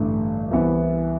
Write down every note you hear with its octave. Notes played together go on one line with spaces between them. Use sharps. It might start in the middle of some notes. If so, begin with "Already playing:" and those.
Already playing: A1 G2 D3 A3
C2 C3 E3 B3 E4